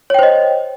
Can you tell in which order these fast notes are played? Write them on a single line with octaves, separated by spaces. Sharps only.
C#5 G5 C5 D#5